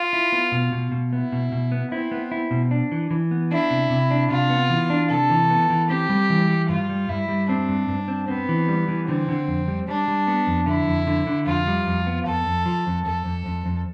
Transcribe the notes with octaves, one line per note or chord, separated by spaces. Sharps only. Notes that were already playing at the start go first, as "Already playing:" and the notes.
Already playing: F4
E4
B3
B2
B2
B2
B3 E4
B2
B2
B3
C4 E4
B3
E4
B2
D4
E3
E3
B3
D4 E4
C3
C3
D4
C3 F4
B3
E3
D4
C3 A4
E3
B3
E3
C4 G4
G3
E3
G3
G2 F4
G3
G2 E4
G3
C4 D4
G2
G2
C4
B3 C4
E3
G3
E3
D3 C4
D3
F2
G3
G3 D4
G3
B3
F2
D3 E4
F2
D3
D3
F2 F4
G3
F2
B3
F2 A4
F2
F3
F2
F2 A4
F2
F2
F2